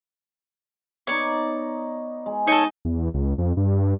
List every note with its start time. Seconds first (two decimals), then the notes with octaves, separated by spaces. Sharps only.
1.07 B3 D#4 C#5 D5
2.26 G#3
2.47 D#4 A4 C#5
2.85 E2
3.14 C#2
3.38 F2
3.57 G2